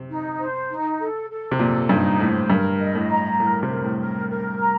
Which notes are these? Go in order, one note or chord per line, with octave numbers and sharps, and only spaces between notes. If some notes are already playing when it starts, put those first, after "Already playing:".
Already playing: C3
D#4
C5
D#4
A4
A4
C3
A#2 A4
G2 D#4
A2 C5
G2 A#4
D#5
A2
A#5
A2 A#4
C3
A#4
A2
A#4
A#4
A#5